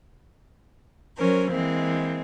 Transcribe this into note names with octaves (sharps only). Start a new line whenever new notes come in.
F#3 C#4 A#4 C5
E3 G#3 A#3 C4